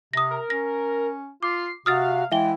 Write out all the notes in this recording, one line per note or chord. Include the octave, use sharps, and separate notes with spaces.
C3 D#6 A#6
A#4
C#4 A#6
F4 D6 C7
C3 F#4 F5 D#6 F6 A6
E3 G#3 E5 F5 G5 G7